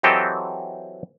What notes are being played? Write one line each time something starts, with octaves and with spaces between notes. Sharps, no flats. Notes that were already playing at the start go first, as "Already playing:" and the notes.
E3 F#3 C4 G4 A4 D#5